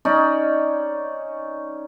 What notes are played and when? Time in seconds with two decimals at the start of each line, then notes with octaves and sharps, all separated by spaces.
0.05 C#4 D#4 D5